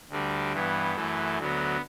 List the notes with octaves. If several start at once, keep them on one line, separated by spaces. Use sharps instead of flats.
D2 D3 G3
G2 E3 B3
F#2 E3 A3
D2 D3 F#3 B3